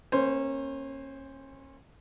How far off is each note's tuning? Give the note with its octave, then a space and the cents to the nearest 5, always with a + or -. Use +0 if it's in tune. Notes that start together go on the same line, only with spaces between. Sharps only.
A#3 +0 C#4 -30 C5 -5